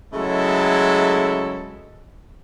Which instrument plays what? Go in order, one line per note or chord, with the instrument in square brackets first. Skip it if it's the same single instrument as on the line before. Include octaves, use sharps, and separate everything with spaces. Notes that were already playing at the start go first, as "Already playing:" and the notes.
[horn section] C#3 F#3 G#3 A3 E4 A4